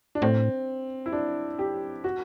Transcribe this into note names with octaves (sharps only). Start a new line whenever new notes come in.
D4
A2 C4
E4
D4
G4
F#4